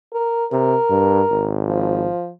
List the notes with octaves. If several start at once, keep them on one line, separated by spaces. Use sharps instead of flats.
A#4
C3 A#4
G2
G#1
F3